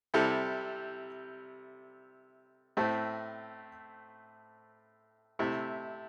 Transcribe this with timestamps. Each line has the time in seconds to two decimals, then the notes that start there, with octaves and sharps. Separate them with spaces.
0.14 C3 G3 E4 A4
2.77 A2 A3 C4
5.39 C3 A3 E4